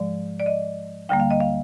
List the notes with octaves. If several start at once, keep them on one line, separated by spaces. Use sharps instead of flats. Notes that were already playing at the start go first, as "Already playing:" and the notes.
Already playing: G#2 F3 G#3 D5
D5
D#5
D2 D3 G3 A#3 G5
F5
D#5
F5